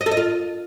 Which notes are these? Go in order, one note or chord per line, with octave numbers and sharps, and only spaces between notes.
D#5
A4
D#5
F4